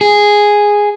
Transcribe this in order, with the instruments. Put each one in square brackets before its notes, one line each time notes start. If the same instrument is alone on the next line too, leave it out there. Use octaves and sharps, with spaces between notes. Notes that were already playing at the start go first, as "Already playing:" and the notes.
[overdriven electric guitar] G#4